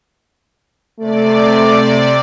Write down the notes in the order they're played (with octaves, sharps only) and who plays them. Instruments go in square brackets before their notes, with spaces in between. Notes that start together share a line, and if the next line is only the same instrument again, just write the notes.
[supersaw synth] C3 D5 [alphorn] A3